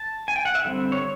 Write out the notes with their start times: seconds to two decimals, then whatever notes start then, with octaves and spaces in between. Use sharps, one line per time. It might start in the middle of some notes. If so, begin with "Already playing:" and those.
Already playing: A5
0.28 G#5
0.36 G5
0.45 F#5
0.55 E5
0.64 D3 G3 C4
0.92 C#5